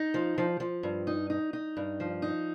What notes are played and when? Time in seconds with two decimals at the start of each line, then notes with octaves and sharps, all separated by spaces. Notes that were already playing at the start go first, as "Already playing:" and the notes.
Already playing: D#4
0.14 F3
0.38 F3
0.60 F3
0.83 G2
1.07 D#4
1.30 D#4
1.53 D#4
1.77 G2
2.00 F3
2.22 D#4